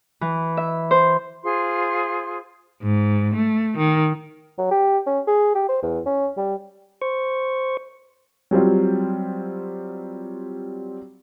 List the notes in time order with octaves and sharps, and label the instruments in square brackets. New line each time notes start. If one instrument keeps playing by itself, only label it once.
[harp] E3
E5
C5
[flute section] F4 G#4 C5 C6
[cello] G#2
A3
D#3
[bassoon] F#3
G4
C#4
G#4
G4
C5
E2
C#4
G3
[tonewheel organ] C5 C#6
[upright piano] F#3 G3 C4 F4